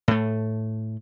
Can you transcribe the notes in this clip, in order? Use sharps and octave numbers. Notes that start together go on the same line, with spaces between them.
A2 A3